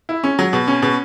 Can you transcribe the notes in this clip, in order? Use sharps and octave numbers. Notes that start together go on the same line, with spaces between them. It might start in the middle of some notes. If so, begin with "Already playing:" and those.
E4
C#4
F#3
B2
C#4
B2